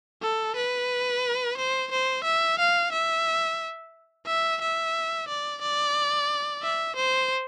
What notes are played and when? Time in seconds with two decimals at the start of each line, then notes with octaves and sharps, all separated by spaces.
0.22 A4
0.56 B4
1.57 C5
1.91 C5
2.24 E5
2.59 F5
2.92 E5
4.26 E5
4.61 E5
5.28 D5
5.62 D5
6.62 E5
6.96 C5